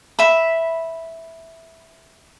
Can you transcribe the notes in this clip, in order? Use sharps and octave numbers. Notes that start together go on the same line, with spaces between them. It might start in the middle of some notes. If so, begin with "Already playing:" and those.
E5 B5